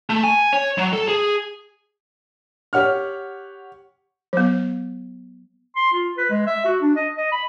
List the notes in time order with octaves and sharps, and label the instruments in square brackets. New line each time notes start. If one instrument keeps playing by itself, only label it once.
[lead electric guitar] A3
G#5
C#5
F#3
A4
G#4
[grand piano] G4 C#5 F#5 F6
[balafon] F#3 B3
[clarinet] C6
F4
B4
G#3
E5
F#4
D4
D#5
D#5
B5